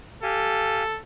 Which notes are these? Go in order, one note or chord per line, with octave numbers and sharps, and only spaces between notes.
G4 A4 F5 G#5